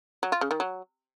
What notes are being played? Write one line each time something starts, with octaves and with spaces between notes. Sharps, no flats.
F#3
F4
C#3
D#3
F#3